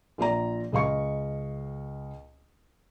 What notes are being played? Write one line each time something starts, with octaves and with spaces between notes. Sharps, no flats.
A#1 F4 D5 A#5
C#2 D#5 F5 C#6 C#7